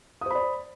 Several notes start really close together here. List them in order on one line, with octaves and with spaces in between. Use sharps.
D#6 C5 B5 D5